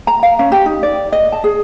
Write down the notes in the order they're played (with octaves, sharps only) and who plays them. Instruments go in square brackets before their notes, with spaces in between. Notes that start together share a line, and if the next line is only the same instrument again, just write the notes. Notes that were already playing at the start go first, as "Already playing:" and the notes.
[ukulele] A#5
F5
C#4
G4
D#4
D5
D#5
A5
G#4